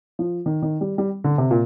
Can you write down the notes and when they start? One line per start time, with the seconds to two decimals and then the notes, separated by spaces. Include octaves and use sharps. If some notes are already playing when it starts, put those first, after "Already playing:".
0.19 F3
0.46 D#3
0.62 D#3
0.81 G3
0.98 G3
1.24 D3
1.38 C3
1.51 A#2